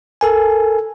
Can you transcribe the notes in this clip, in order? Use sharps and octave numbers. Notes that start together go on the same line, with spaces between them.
A4 A#4 G#5